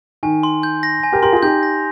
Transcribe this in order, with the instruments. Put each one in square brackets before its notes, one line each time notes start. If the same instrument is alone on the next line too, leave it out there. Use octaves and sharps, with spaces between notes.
[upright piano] D#3 [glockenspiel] G#5
[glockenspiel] C6
G6
A#6
G#5
[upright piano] G4 A#4
[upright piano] G4 A#4 [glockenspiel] C6
[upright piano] F4 G#4
[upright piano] D#4 G4 [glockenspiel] G6
[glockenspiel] A#6